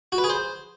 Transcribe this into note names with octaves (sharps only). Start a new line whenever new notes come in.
F#4
B4
G#4
C5